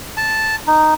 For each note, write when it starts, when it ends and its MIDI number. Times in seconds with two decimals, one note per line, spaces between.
0.17 0.56 81
0.67 0.94 63